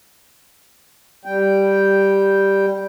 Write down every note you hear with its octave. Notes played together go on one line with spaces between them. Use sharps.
G3 G5